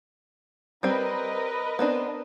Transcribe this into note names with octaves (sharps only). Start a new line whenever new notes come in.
G3 C4 A#4 B4 D#5
B3 C4 D4